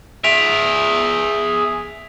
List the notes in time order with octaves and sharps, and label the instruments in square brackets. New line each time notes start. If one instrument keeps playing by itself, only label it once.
[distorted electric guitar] G#4 E5 [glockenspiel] B6 D7 F7